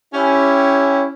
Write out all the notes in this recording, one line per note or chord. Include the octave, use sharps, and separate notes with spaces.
C#4 E4 G4